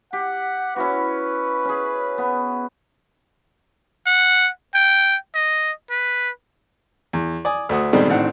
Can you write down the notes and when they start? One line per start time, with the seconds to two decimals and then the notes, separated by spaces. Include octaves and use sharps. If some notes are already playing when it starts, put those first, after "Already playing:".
0.13 G4 F#5
0.76 C#4 E4 F#4 B4
1.65 C#4 G#4
2.18 B3
4.07 F#5
4.75 G5
5.35 D#5
5.90 B4
7.13 E2
7.45 D5 G#5 D#6
7.69 D2 A3 F#4 D#6
7.93 B2 D3 D#3 G3 G#3 C4
8.09 A1 A2 D#3 C4 D4 F#5